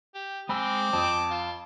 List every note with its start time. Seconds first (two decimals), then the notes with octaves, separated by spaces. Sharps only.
0.14 G4
0.49 G#3 C4 G#5 B5 D6 E6
0.93 F2 A5 D#6
1.30 F4